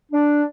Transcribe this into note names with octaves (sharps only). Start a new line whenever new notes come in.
D4